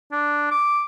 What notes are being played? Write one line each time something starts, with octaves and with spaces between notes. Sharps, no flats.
D4
D6